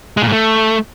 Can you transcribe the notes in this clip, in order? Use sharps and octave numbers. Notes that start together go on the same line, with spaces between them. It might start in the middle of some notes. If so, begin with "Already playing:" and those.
G#3
A#2
G#2
A3